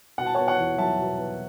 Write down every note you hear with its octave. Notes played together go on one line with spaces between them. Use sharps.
B2 F#5
A5
B3 C#5 F#5
C#5 F#5
E2
F#3 E5 A5
B2
B3